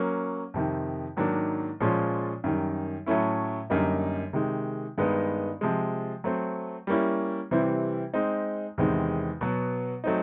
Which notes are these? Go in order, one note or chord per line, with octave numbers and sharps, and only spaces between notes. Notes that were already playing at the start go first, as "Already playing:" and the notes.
Already playing: F#3 A#3 C#4
F2 C3 D#3
G#2 D#3 F#3 A#3 D4
A#2 F3 G#3 C#4 F4
F#2 D#3 G3
A2 F#3 A3 C#4 E4
F#2 D3 G3 A#3 D#4
C3 D#3 G#3
G2 D#3 G#3 B3 D#4
C3 F3 G#3
F#3 A3 C4
G3 A#3 C#4 E4
C3 E3 G3 C4 E4
G#3 C4 D#4
E2 C3 D#3 G#3 C4
B2 F#3 B3
F#3 A3 C4 D#4